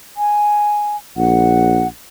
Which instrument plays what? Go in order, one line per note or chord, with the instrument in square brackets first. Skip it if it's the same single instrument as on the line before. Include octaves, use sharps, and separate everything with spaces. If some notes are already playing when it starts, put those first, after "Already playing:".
[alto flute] G#5
[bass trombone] A#1 [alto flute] F#5